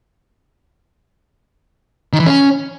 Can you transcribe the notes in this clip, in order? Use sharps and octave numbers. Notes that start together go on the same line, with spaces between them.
D#3
E3
C#4